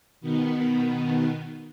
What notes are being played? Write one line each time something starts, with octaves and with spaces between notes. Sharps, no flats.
B2 D#3 B3